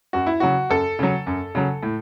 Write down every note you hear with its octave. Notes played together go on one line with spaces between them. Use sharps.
F#2 F#4
E4
C#3 F#3 F#4
F#2 A4
C#3 F#3
F#2
C#3 F#3
A2